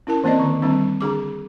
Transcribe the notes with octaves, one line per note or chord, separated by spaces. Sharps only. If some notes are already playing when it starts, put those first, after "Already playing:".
C#4 E4 A#4 A5
E3 A#3 C4 D5 D#5
D3 D#3
D3 D#3 G3 C4 D4
D3 D4 G#4 D6